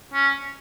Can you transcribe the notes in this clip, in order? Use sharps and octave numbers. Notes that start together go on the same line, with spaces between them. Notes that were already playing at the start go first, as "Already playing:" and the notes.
C#4